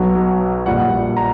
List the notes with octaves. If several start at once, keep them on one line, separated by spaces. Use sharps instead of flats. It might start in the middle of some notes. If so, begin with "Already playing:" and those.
Already playing: B1 B2 F#3
A#1 A#2 G3 F#5
A#5